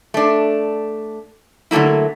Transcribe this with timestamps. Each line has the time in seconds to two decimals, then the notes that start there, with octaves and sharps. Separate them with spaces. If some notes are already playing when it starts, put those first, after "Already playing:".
0.14 A3 D4
1.71 D3 F#3 A3 A#3 E4